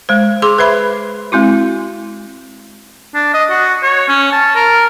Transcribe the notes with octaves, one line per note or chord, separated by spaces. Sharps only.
G#3 C5
G#4 C6 D6
B4 C5 E5 B5
G#3 C4 E4 F#4
D4
D#5
F#4
C#5
C#4
A5
A#4